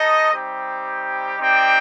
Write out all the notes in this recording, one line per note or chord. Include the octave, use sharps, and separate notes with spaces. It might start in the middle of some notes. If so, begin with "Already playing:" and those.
Already playing: D#4 A4 D#5
G3 C4 D#4 G4
C4 D#4 G4 D5 G5